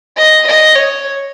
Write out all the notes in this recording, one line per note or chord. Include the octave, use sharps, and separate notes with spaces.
D#5
D#5
C#5